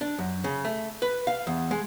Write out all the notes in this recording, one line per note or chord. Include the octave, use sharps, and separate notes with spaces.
D4
F#2
C#3
A3
B4
F5
E2
G#3